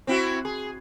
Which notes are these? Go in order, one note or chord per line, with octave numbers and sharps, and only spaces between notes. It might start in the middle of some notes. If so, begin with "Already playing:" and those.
C4 E4 F#4
G#4